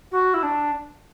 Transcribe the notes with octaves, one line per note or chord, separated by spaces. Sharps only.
F#4
E4
D4